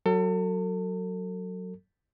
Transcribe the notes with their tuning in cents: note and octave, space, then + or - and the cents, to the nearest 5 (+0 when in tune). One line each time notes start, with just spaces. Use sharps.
F#3 +0 A4 +35